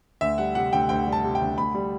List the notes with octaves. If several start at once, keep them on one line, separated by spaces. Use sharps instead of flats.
D2 E5
G3 F#5
C3 F#5
D2 G5
D2 G5
G3
A5
C3
G5
D2
D2 B5
G3